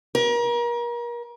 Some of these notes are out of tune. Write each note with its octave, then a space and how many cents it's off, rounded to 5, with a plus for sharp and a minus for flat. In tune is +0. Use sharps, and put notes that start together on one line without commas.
A#4 +35